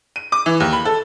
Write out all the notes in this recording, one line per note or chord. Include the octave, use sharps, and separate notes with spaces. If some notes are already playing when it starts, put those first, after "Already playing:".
D#7
D6
E3
D#2
B5
A4